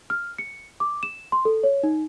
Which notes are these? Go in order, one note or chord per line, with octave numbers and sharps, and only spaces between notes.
F6
C#7
D6
E7
C6
A4
C#5
D#4